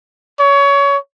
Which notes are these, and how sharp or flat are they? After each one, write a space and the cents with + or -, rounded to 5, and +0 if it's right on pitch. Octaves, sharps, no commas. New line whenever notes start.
C#5 +25